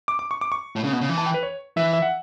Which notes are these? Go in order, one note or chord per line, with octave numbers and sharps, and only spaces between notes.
D6
D6
C#6
D6
C#6
A2
C#3
B2
C#3
E3
A5
G5
B4
C#5
E3 E5
E5
F#5